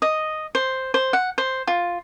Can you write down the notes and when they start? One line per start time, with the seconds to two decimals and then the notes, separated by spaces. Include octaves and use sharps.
0.02 D#5
0.55 C5
0.94 C5
1.13 F#5
1.38 C5
1.67 F4